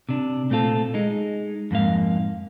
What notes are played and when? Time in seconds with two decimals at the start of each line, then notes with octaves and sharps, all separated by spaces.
0.09 C3 D4
0.50 A#2 A3 C4 F4 A4
0.94 G#3 D#4
1.71 F2 G#2 A#3 F5